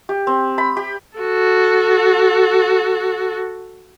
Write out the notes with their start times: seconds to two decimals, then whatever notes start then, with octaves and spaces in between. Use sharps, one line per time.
0.09 G4
0.27 C4
0.58 B5
0.77 G4
1.18 F#4 A4